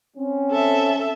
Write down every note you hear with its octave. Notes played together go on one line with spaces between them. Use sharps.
C4 C#4
A4 E5